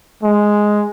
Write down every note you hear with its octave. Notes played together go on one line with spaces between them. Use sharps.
G#3